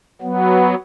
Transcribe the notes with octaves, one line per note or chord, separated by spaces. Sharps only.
F#3 B3